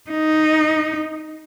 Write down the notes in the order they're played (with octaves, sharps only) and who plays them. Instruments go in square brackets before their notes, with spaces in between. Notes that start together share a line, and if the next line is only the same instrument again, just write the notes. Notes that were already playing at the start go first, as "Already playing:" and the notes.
[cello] D#4